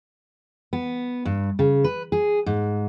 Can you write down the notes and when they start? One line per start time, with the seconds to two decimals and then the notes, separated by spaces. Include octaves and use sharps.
0.73 B3
1.25 G2
1.59 C#3
1.84 B4
2.12 G#4
2.46 G#2